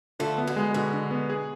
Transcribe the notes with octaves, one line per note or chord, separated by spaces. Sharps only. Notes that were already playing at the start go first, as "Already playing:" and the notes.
D3 F3 A3
B3
B2
G#3
B2 D3
D3
B3
G#4